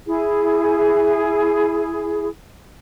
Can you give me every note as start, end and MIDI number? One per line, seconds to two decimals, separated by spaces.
0.06 2.28 64
0.06 2.28 68